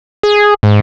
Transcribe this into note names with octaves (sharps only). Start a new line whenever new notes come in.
G#4
G#2